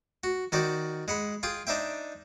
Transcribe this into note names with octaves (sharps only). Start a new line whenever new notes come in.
F#4
D#3 F#4 C5 D5
G#3 F#5 B5
F4 G#4 G5 C6
D4 D#4 C5 E5 G5